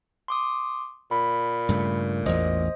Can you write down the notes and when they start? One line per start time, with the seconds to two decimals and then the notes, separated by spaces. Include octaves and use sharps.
0.28 C6 D6 D#6
1.11 A#2 B5
1.69 G2 C#3 A3
2.26 A1 E2 C5 D#5 D#6